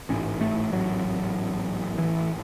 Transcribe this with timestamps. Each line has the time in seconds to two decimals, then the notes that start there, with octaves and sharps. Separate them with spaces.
0.09 A1 G#2 C#4
0.41 A3
0.73 F#3
1.98 E3